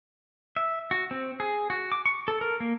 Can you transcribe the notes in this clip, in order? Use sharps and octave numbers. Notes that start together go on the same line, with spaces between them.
E5
F#4
C4
G#4
F#4
D6
C#6
A4
A#4
A#3